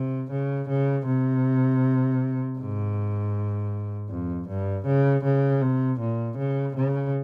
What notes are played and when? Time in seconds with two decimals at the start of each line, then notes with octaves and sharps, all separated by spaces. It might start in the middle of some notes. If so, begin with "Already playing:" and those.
Already playing: C3
0.31 C#3
0.69 C#3
1.06 C3
2.58 G#2
4.10 F2
4.48 G2
4.86 C#3
5.24 C#3
5.61 C3
6.00 A#2
6.38 C#3
6.76 C#3